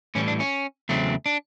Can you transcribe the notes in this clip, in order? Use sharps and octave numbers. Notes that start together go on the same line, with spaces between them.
A2 E3 G3 C#4
D4
C#4
E2 C#3 F#3 A3 C4
D4